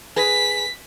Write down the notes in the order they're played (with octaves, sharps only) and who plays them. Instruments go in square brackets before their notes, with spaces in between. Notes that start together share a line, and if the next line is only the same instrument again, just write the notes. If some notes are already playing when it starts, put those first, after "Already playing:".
[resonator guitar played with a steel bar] G#4 B4 [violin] B6